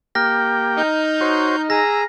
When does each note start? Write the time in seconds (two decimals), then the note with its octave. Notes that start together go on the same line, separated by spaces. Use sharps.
0.15 A#3 G4 G5 F6 A#6
0.77 D#4 G6
1.21 F#4 C5 C#5
1.70 G#4 A#5 E6 A#6